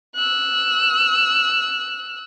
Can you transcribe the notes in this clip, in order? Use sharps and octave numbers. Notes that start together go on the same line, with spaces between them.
E6 F#6